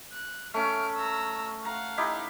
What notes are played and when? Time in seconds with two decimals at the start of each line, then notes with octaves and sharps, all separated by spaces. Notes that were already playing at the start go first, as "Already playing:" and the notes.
0.12 F#6
0.54 A3 C#4 F6 D7
0.96 A#5 E6
1.65 F5 F#5 A#5
1.98 D#4 E4 G4